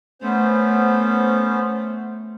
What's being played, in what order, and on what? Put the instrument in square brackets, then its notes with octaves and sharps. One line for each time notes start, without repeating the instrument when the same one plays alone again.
[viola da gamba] A3 [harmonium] B3 C#4 C5